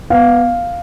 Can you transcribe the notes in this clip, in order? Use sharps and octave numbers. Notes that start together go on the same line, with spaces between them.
B3 F5